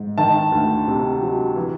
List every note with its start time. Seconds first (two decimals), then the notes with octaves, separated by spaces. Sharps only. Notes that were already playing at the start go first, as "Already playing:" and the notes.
Already playing: G#2
0.18 D#3 A5
0.52 D2
0.88 C3
1.21 F#3
1.56 E3